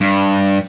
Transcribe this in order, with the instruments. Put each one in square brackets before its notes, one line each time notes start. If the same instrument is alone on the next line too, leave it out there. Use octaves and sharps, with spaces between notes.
[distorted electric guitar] G2